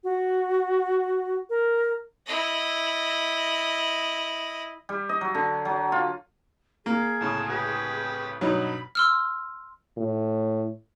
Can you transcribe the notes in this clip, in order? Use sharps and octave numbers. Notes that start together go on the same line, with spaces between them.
F#4
A#4
E4 D#5
G3
D#5
F#3
D3
F#3
F4
A#3 G#4
C2 A2 C#3 A5
G4 B4
G2 B2 F#3 D#4 B5
C6 E6 F6
A2